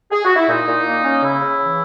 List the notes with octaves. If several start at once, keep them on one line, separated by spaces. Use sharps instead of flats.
G#4
F#4
E4
A#2 D#4
A#2
A#3
C#4
C#3 E4
C#3
E3